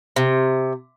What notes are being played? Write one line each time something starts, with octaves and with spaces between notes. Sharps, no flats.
C3